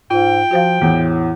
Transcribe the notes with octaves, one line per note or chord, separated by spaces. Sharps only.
G#2 F4 G5
F3 F#4 C5 F5
E2 A2